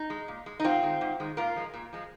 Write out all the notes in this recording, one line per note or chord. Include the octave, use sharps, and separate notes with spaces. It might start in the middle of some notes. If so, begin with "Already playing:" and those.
Already playing: D#4
G#3
A#2
G#3
D#4
G#2 C4 F4
D#3 G#3
G#2
D#3 G#3
A#2 F4 A#4
F3 G#3
A#2
F3 G#3